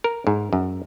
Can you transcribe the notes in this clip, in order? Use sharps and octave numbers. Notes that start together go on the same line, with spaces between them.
A#4
G#2
F#2